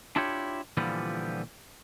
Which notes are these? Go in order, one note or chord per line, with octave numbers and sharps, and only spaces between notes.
D4 E4 F4 G4 C#5
A#2 D3 E3 F3 G3 B3